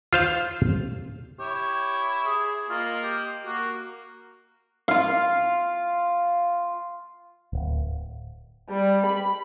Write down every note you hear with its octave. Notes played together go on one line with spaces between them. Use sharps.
F4 C5 F5
E4 G4 C#5
G#4
A#3 F4 D#5
G4
A#3 F#4
F4 F5
D1
G3
B5